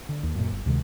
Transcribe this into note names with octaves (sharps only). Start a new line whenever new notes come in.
D3
D#2
F#2 A#2
G1
D2 C3 D#3 G#3